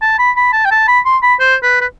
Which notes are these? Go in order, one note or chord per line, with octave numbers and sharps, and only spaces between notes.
A5
B5
B5
A5
G5
A5
B5
C6
B5
C5
B4
B4